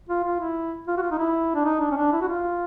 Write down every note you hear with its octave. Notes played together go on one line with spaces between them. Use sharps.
F4
F4
E4
F4
F#4
F4
D#4
E4
D4
D#4
D4
C#4
D4
E4
F#4
F4